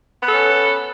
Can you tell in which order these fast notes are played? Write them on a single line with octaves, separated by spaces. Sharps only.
B3 A4 C#4